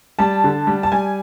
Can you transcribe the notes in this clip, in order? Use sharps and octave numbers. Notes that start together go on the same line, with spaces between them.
G3 A5
D3
G3
A5
G3 G#5